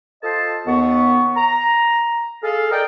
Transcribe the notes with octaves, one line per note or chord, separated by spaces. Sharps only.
F4 A4 C5 D#5 A5
D#2 B3 C#6
A#5
G#4 A4 F5
G#4 A#4 D5 D#5 G5